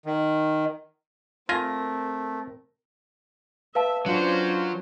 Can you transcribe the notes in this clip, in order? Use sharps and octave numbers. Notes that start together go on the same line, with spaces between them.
D#3
A3 C4 F4 A#4 G#5 A#6
B4 E5 F5 A5
F#3 C#4 D4 F4 C5